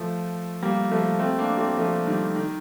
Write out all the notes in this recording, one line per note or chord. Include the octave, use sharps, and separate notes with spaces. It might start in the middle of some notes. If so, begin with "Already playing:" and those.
Already playing: F3 A3
G3 A#3
F3 A3
A3 C4
A#3 D4
A3 C4
F3 A3
D#3 G3
D#3